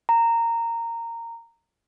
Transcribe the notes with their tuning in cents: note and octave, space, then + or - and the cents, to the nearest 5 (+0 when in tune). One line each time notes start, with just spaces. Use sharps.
A#5 -15